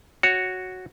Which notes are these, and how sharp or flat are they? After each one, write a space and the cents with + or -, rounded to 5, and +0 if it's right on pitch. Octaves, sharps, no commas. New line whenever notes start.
F#4 +0 C#5 +0